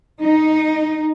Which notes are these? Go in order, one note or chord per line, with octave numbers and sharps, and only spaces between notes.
D#4